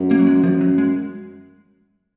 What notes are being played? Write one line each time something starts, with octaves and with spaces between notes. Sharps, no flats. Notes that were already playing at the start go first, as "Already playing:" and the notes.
Already playing: F#2
A#3
F#3
G#3
F#2 F3
F#3
G#3